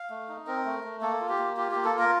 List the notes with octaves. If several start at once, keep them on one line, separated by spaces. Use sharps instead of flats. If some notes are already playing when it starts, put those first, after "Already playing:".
Already playing: F5
A3
D#4
C4 A#4
A3
A3
A#3 A4
F4
G4
A#3
F4 G4
A#3 G4
A4
F4
A#4